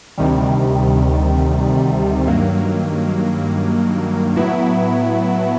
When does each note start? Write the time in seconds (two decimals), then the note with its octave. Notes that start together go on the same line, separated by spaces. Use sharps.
0.18 D2 C3 D#3 G3
2.27 G2 D#3 F#3 A#3
4.36 A2 F#3 B3 E4